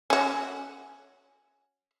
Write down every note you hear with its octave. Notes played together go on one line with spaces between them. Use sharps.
C#4 F#4